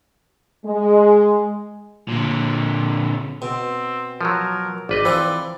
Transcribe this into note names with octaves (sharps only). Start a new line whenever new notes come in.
G#3
A#2 D3
B2 C4
F3 F#3 A#4
G#1 B4 D5 D#5
E3 F3 C4